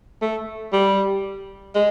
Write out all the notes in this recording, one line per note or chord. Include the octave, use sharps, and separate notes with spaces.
A3
G3
G#3